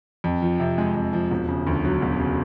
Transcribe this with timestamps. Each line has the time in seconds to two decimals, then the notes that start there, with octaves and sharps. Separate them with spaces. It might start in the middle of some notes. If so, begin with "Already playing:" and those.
0.24 F2
0.42 F3
0.60 C3
0.78 G#3
0.95 F2
1.13 F3
1.31 E1
1.48 C#3
1.67 D2
1.84 F#3
2.02 E1
2.20 C#3